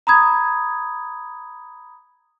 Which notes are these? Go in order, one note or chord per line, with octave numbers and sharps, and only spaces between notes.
A#5 B5 D#6 G#6